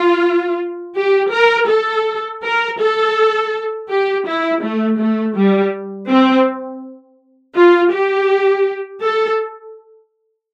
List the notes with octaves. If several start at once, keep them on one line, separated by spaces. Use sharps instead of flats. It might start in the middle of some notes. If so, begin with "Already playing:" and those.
Already playing: F4
G4
A#4
A4
A#4
A4
G4
E4
A3
A3
G3
C4
F4
G4
A4